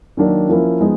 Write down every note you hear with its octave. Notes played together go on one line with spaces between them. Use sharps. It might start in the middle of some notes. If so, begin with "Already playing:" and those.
D#3 F#3 A#3 D4
F3 A#3 C#4 E4
F3 G#3 B3 D#4